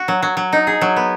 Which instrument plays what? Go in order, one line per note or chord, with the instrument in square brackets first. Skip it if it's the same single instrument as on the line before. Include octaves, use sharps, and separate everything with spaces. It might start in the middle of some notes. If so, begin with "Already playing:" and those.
Already playing: [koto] F#4
F#3
F#3
F#3
D#4
G#4
F#3
B3